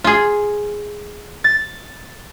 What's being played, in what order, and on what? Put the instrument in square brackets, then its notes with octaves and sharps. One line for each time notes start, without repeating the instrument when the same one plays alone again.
[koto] F4 G#4
[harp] A6